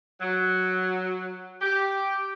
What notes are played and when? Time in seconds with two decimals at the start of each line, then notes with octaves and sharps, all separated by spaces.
0.21 F#3
1.61 G4